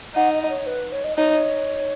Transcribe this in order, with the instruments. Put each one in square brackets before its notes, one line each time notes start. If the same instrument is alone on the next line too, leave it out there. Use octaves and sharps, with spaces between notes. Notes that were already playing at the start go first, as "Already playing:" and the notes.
[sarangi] D#4 [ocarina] F#5
[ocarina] D#5
D#5
C#5
B4
C#5
D#5
[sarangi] D#4 [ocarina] C#5